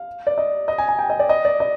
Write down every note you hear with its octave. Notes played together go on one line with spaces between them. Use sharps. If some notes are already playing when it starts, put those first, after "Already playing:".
Already playing: F5
D5
D#5
D#5
G#5
G#5
G5
D#5
D5
D#5
D5
D#5